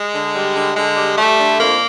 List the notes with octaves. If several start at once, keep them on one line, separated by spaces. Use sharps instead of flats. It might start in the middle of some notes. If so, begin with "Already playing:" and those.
Already playing: G#3
D3
G3
D3
D3 G#3
G3
G3 A3
D3
F2 A#3